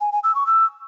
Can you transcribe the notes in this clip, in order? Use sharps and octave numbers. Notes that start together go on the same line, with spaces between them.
G#5
G#5
E6
C#6
E6